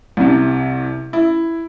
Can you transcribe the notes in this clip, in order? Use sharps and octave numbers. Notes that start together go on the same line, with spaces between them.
C2 C3
E4